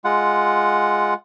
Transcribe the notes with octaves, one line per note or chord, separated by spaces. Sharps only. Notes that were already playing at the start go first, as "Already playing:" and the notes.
G#3 F4 F#5